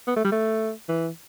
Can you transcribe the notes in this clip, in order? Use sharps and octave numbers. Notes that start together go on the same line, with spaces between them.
B3
A3
G3
A3
E3